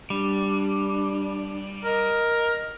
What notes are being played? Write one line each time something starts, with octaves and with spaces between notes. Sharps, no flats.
G3 D4
A#4 D#5